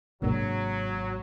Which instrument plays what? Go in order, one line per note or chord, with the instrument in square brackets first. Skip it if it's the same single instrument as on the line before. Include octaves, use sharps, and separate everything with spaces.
[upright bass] G#1 [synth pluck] C3 A#3 D4 [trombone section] F#3